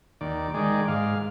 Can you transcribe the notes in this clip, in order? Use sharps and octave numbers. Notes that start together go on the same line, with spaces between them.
D#2 D5
D#3 G#3 D5
G#2 F5